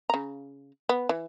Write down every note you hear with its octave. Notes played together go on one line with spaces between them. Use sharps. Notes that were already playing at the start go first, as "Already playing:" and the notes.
C#3 A#5
B3
E3